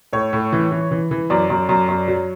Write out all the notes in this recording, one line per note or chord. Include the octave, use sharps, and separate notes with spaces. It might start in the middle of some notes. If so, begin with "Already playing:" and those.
A2 C#5
A2
E3
E3
E3
E3
F#2 D5
F#2
F#2
F#2
F#3